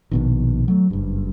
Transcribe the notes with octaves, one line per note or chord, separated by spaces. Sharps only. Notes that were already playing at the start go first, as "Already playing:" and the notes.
A#1 B2 D#3
F#3 A3
F#1 G2